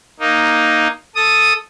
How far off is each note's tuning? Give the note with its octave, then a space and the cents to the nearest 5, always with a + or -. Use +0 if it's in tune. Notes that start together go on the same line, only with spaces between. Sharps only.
A#3 +5 D#4 +0
A4 +0 D#6 +0